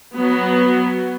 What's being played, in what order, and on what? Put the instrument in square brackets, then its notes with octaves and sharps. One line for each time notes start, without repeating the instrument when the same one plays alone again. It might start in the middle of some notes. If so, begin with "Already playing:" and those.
[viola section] F#3 B3